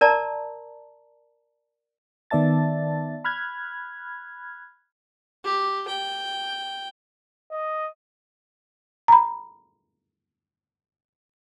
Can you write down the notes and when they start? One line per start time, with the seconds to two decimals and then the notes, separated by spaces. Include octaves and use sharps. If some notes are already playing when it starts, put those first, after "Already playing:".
0.01 A#4 D5 A5 A#5
2.31 D#3 B3 D5 E5 A5 A6
3.25 B5 F6 F#6 G#6
5.44 G4
5.88 G5
7.52 D#5
9.08 A#5 B5